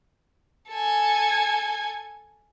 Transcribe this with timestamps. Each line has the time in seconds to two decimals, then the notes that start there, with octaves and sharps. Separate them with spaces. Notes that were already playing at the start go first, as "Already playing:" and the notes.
0.70 A4 G#5